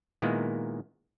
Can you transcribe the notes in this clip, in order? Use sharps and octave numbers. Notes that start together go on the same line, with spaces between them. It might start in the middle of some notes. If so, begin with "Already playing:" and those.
A#2 D#3 G#3 A#3 B3 E4